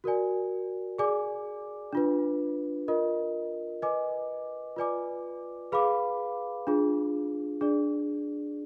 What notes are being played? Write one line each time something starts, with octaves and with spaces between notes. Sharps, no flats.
F#4 A#4 D5 G#5
G#4 D5 G#5 D6
D4 F4 B4
F4 A#4 D#5
B4 D#5 G#5 D6
F4 B4 D5 G#5 D6
G#4 B4 F5 B5 D6
D4 F4 G#4
D4 G#4 D5